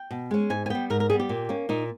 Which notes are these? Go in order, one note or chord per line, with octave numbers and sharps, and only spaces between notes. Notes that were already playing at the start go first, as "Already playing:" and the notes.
Already playing: G5
B2
G#3 C#4
G#2 G#5
G#5
G3 B3 G5
G#2 A#4
A#4
G3 B3 G#4
G4
A#2
A#3 C#4
A#2 D#4